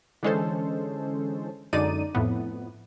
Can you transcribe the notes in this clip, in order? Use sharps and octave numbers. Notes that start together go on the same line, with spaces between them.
D3 E3 G#3 C#4 A4 C5
F#2 D3 G#3 D#4 D5 D#7
F2 A2 B3